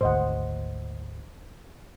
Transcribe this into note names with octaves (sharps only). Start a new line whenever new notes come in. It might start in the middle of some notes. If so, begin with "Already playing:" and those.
G#1 D2 C5 D#5 F#5